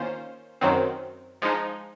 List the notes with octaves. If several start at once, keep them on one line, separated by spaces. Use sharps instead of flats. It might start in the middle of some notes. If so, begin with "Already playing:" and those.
Already playing: D#3 A#3 C#4 F4 C5
F#2 D#3 F#3 C4
F3 G#3 D#4